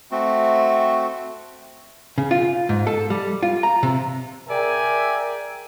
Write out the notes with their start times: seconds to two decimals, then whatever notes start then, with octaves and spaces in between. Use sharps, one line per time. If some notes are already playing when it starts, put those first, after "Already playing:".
0.11 A3 C4 F#4
2.18 C#3
2.31 F4
2.69 G#2
2.87 A4
3.10 G3
3.43 F4
3.63 A#5
3.83 C3
4.48 G#4 A#4 D5 E5 G5 G#5